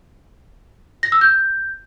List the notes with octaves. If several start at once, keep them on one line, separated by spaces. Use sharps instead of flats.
A#6
E6
G6